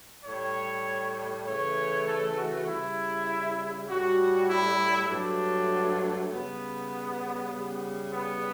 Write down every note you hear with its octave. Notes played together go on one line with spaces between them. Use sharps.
A2 G3 C#5
C#3 E3 A3 C#5
A4
F#4
C#3 G3 E4
A2 G3 F#4
E4
G2 F#3 A3 D4
C#3 G3 B3
C#3 G3
B3